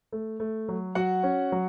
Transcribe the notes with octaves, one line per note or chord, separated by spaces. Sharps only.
A3
A3
F#3
F#3 F#4 F#5
C#4
F#3